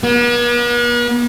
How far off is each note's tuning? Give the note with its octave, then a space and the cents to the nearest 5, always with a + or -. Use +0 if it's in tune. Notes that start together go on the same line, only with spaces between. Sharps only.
B3 -45